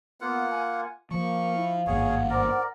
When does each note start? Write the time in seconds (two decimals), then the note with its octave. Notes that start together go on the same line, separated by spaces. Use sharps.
0.21 A#3 B3 F4 F#5
0.52 G#5
1.11 F3 A#3 F5 C#6
1.55 E4
1.87 G#1 G2 A#3 G#4 C#5 F#5
2.30 A#4 C5 D5